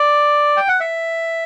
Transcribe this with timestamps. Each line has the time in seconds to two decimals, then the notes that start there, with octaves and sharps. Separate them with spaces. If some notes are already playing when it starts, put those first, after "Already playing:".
Already playing: D5
0.57 G5
0.68 F#5
0.80 E5